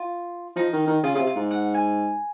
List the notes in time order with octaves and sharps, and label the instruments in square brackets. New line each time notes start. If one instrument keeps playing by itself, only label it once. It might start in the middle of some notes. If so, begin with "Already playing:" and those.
Already playing: [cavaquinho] F4
[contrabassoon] F3 [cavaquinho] D#4
[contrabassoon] D#3
D#3
[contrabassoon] C#3 [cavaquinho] F4
[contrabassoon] C#3 [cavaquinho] F4
[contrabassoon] C3
[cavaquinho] F4
[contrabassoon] G#2
[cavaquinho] F#5
G#5